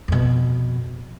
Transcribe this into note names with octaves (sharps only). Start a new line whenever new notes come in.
F2 B2